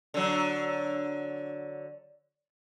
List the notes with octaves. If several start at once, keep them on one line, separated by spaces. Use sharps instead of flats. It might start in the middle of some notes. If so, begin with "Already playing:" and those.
D3 F#3